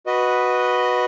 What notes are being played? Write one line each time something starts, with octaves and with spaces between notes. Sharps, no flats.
F#4 B4 D#5